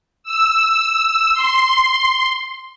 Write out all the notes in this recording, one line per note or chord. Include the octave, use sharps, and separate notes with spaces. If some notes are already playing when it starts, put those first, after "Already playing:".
E6
C6